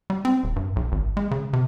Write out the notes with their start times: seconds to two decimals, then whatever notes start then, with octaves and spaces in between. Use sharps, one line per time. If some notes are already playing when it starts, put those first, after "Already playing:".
0.10 G3
0.25 C4
0.44 D#1
0.56 G2
0.76 B1
0.92 G#1
1.17 G#3
1.31 C#3
1.53 C3